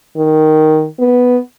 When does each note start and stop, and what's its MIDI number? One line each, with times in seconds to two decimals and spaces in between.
0.17 0.87 51
1.00 1.39 59